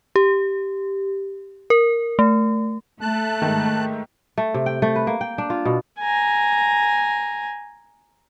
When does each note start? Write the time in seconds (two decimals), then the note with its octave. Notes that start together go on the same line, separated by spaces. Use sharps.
0.16 G4
1.70 A#4
2.19 A3
3.01 A3 A5 F#6
3.42 G#2 D#3
4.38 A3
4.54 C3
4.66 G5
4.82 A3
4.96 B4
5.07 A#3
5.21 G5
5.38 D4
5.50 F4
5.65 B2
5.99 G#5 A#5